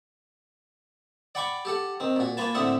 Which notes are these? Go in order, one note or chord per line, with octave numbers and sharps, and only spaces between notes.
D5 F#5 G5 B5 C#6 D6
G4 A4 F#5
D#3 C4
A#2 F#4
A#3 F4 B4 G#5 A5
A2 D3 C4 E5 F#5 D#6